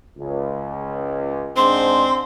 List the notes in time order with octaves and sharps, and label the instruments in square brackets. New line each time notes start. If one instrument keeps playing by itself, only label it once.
[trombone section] C#2
[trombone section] G#2 D4 [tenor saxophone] C4 [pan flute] C6